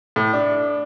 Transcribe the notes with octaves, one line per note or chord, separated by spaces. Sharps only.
A2
D4